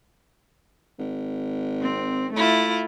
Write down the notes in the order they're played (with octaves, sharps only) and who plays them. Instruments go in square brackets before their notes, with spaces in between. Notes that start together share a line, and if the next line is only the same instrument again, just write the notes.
[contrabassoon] G#1
[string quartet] C4
A3 E4 F4